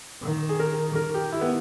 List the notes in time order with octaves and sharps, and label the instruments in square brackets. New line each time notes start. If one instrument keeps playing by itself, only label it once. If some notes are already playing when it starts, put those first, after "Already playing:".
[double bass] D#3
[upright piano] G#4
A#4
[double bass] D#3 [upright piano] A#4
[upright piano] G4
E4
B3